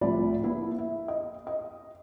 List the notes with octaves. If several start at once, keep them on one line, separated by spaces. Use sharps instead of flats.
C2 A2 F3 D5 B5
A#3 B3 E4
E5
D#5
D#5